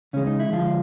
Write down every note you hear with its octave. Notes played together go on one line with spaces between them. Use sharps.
C#3 E3 G#3 C#4
D#4
E4
D3 F3 G#3 F4